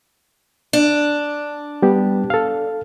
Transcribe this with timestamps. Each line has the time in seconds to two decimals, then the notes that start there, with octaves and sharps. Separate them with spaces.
0.73 D4
1.82 G3 B3 G4
2.30 A4 F5